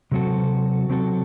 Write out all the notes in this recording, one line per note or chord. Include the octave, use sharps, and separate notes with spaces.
C3 F#3 C4 F#4 A4
C3 F#3 C4 F#4 A4